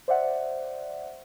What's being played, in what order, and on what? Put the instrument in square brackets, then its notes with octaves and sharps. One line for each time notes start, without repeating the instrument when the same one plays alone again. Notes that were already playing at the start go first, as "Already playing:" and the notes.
[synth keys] C5 D5 E5 F#5